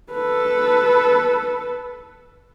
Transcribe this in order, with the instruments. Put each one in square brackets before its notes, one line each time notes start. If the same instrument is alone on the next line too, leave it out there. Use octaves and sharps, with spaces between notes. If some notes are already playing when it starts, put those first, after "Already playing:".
[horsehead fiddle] A4 B4